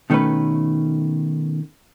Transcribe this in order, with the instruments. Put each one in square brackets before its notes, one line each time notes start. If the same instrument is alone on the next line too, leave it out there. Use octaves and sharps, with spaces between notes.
[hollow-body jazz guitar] B2 D#3 A3 C4 C#4 B4